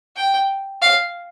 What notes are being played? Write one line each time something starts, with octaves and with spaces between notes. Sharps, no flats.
G5
F5